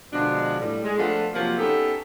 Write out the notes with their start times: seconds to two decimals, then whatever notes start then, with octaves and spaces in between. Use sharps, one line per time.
0.13 B2 D3 F3 G#3 D4
0.60 A2 G3
0.84 G#3
0.97 F3 A3 B3 D4 F4 A4
1.33 C3 F3 F#3 A#3
1.59 B3 C#4 D#4 G4 A4